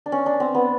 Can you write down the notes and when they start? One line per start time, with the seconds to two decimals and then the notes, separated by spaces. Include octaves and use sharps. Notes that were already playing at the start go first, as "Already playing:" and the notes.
0.06 D4
0.12 C#4
0.26 D4
0.40 C4
0.55 B3